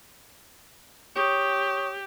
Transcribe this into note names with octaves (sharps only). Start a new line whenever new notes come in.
G4 C#5 C#6 D#6